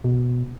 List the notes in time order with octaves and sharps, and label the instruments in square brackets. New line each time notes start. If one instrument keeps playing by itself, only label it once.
[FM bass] B2